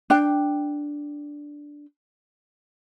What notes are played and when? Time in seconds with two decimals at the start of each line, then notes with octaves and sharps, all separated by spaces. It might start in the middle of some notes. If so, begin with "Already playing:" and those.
0.10 D4 G5